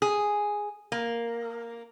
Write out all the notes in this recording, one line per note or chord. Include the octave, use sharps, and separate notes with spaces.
G#4
A#3